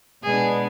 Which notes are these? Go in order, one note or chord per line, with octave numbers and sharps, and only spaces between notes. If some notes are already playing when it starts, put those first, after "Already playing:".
B2 G#3 B3 D4 G#4